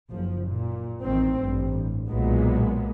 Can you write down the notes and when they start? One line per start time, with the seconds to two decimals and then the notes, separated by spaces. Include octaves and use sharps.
0.10 F#1 F3
0.48 A#2
1.02 A1 D#3 C4
1.41 A1 G2
2.09 B1 A#2 F#3 G#3 B3